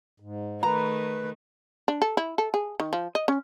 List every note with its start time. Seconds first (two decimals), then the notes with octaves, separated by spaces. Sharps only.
0.20 G#2
0.63 D#3 A3 B4 A#5
1.88 D4
2.02 A4
2.17 E4
2.38 A4
2.54 G#4
2.80 D#3
2.93 F3
3.15 D#5
3.28 C#4